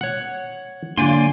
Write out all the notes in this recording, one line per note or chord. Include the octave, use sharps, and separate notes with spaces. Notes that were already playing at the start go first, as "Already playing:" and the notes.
C#5 F#5
D3 F#3 A#3 D5 G#5 C6